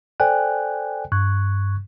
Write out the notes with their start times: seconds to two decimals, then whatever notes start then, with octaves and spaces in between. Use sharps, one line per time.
0.20 A4 C5 D5 G5 G#5 F#6
1.12 G2 C#6 F#6 G#6